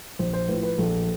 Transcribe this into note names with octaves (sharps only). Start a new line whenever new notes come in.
A#1 C5
C5
A2 F3 B4
B4
A#1 A4